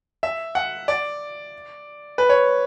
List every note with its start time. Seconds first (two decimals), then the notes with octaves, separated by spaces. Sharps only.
0.23 E5
0.55 F#5
0.88 D5
2.18 B4
2.29 C#5